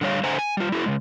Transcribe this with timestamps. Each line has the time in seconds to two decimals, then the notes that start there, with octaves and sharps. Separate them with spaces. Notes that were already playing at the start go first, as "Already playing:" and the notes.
0.01 D3 G3 C#5 F5
0.23 D3 C5 E5 F#5 G#5 A#5
0.39 G#5
0.57 G3 F4
0.72 E4 F#4 G#4 A#4
0.86 C#3 G#3